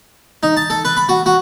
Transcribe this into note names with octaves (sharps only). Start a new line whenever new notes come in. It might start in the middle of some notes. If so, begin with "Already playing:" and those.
D#4
A5
A4
B4
B5
F#4
F#4